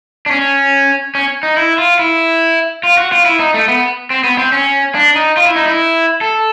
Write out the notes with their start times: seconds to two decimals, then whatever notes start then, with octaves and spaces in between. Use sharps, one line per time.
0.26 D4
0.31 C#4
1.15 C#4
1.43 D#4
1.57 E4
1.78 F4
1.99 E4
2.83 F4
2.98 F#4
3.12 F4
3.26 E4
3.40 D#4
3.54 A3
3.68 B3
4.10 C4
4.24 B3
4.38 C4
4.52 C#4
4.95 D4
5.16 D#4
5.37 F4
5.46 E4
5.56 D#4
5.66 E4
6.21 A4